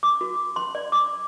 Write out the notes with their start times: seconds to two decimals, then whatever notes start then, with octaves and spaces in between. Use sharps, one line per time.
0.03 D6
0.21 F#4
0.56 C6
0.75 D5
0.92 D6